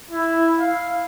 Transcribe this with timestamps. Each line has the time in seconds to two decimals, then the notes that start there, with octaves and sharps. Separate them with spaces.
0.10 E4
0.60 F5